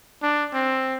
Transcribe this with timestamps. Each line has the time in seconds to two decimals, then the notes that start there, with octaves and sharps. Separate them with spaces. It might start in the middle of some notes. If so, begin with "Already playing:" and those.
0.23 D4
0.54 C4